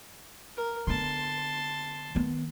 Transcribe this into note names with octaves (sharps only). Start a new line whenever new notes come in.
A#4
D3 B3 A5 C6
D#3 B3